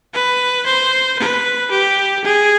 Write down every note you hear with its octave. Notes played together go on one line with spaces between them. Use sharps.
B4
C5
B4
G4
G#4